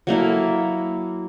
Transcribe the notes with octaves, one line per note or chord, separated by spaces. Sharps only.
F#3 A#3 E4 A4